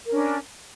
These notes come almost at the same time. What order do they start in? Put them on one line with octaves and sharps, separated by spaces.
A#4 C#4 D4